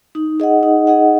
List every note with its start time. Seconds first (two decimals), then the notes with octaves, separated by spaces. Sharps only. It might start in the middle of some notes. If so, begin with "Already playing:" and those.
0.15 D#4
0.40 G#4 D#5 F#5
0.63 D#4
0.87 G#4 D#5 F#5